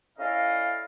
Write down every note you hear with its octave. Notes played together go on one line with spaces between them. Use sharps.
C#4 E4 A4 D5 D#5 F5